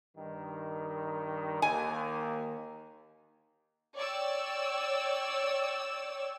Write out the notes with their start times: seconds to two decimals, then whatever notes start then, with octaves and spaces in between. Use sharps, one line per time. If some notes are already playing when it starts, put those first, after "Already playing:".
0.17 G2 D#3
1.62 D#2 G#5
3.95 C#5 D5 G5 E6